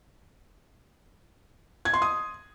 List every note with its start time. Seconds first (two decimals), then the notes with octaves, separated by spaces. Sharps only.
1.85 G#6
1.94 C6
2.02 D#6